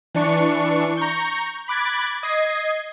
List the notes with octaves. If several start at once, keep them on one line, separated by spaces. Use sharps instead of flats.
E3 D4 C#6
A#5 C#6 G6
B5 D6 F#6 G#6 A6
D#5 D#6 G#6 C7